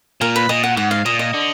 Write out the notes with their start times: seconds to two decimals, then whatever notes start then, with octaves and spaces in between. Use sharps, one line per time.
0.21 A#2 A#4
0.36 B4
0.49 A#2 D#5
0.63 F#5
0.77 G#2 F#5
0.91 F5
1.05 A#2 D#5
1.19 D#5
1.34 D3